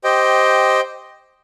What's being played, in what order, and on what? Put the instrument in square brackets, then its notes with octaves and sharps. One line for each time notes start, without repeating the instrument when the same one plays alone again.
[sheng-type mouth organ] G4 C5 D#5 G5